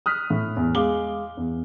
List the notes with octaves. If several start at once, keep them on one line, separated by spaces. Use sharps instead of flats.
D#6 F6 F#6 B6
A2
E2
G#3 G#4 F5 D6 G7
E2